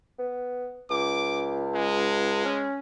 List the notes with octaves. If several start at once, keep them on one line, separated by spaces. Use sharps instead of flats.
B3
C#2 D6
G#3
C#4